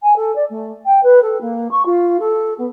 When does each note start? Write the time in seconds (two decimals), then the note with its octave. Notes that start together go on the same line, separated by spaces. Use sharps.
0.02 G#5
0.16 A4
0.35 D5
0.49 A3
0.85 G5
1.03 B4
1.22 A4
1.40 A#3
1.71 C#6
1.85 F4
2.19 A4
2.58 B3